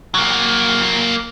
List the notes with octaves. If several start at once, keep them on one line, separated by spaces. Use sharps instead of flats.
F#3 A#3